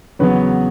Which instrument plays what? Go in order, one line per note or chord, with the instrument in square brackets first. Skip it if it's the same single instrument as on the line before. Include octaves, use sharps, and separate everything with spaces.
[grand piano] E2 C#3 F#3 B3 B4 C#5